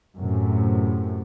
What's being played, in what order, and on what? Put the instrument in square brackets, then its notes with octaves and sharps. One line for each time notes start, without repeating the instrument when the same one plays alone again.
[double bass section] F#2 A2 C3